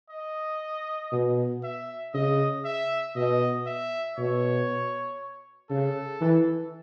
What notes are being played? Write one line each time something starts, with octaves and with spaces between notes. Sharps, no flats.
D#5
B2
E5
C#3 D#5
E5
B2 D#5
E5
B2 C#5
C#3 A4
E3